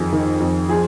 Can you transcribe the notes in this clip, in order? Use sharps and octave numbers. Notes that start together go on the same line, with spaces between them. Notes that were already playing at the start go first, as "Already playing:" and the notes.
Already playing: F2 D#3 G#4
D#3
F2
F3 G#4